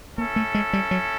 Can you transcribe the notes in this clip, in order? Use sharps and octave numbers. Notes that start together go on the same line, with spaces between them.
A#3 C#4 E4 A4
A3
G#3
G3
F#3